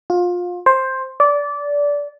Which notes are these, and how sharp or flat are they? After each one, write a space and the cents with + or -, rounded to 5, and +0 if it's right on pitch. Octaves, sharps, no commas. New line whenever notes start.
F4 +25
C5 +10
D5 -20